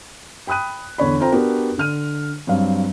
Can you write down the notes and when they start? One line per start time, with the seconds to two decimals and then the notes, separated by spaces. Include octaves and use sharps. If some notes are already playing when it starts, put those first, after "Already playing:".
0.47 G5 B5 D#6 F#6 D#7
0.98 E2 D3 C#5 B5
1.20 C4 F4 A4 C5 G5 A#5
1.32 B3 D4 F#4 G4 A#4
1.78 D3 F6 D#7
2.47 G2 F#3 C4 F5